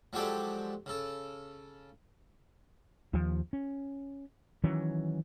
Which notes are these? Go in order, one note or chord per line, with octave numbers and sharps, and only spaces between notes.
F3 F#3 G#3 G4 A4 D5
C#3 A4
D#2 F3
C#4
D#3 E3 F#3 C#4